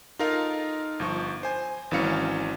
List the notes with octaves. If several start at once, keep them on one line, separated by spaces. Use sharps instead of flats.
D#4 F4 A4 A#4 F5
G1 F3 C#6
C5 G#5
G#1 E3 F#3 C#4 F5 C#7